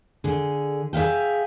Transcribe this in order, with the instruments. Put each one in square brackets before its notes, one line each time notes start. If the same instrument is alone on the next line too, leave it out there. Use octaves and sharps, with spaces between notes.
[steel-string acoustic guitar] D3 G#4
G#4 E5 F5 G5